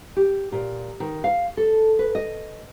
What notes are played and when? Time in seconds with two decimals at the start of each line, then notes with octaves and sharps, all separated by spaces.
0.17 G4
0.52 A#2
1.00 D#3
1.24 F5
1.57 A4
1.99 B4
2.15 D#5